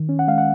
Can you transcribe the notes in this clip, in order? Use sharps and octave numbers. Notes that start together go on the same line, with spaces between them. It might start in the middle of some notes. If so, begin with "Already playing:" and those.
Already playing: D#3
C#4
F#5
G#3 F5
F#5